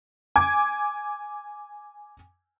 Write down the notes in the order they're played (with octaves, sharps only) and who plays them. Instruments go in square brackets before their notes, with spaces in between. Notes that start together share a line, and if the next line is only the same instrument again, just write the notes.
[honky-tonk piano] G#5 D6 G#6